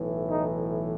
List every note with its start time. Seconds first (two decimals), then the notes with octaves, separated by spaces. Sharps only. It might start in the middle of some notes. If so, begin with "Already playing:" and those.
Already playing: B1 A2 E3
0.30 D#4